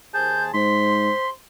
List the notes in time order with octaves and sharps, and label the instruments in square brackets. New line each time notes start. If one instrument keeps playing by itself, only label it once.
[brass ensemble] D#2 C5 [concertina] G#4 A5 [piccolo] G6
[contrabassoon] G#2 [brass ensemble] C5 [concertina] C6 [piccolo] B6